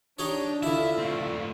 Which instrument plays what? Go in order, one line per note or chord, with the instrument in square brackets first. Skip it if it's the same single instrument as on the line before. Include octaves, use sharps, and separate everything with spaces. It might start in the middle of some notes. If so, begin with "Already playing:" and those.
[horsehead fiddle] D4 [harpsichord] D#4 G4 C#5
[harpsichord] D3 E4 [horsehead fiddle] F4 [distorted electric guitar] E5
[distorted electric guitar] A3 C4